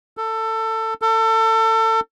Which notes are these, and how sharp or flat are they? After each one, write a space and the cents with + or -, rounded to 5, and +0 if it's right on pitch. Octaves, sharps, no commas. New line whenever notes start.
A4 +20
A4 +30